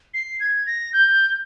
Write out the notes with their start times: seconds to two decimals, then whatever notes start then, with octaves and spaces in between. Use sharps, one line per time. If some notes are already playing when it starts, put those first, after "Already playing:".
0.14 C7
0.40 G#6
0.66 A#6
0.93 G6